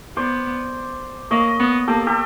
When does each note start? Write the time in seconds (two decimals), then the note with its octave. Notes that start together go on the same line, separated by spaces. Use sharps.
0.16 B3 C5 D5
1.31 A#3 C#5 D#5
1.59 B3
1.87 A#3 G4 A4
2.07 G4 A4